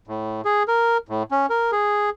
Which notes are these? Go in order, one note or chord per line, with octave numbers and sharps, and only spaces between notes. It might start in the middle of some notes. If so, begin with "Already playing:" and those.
A2
G#4
A#4
A2
C#4
A#4
G#4